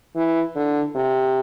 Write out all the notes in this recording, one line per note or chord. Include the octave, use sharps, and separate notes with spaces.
E3
D3
C3